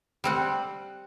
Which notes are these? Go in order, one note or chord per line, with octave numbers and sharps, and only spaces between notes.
G3 C4 F#5